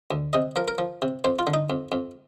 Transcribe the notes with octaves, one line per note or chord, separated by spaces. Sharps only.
D2
C3 D#5
F3 A#4
A#4
F3
C3
F2 C5
F4
D3
D#4
F2
F2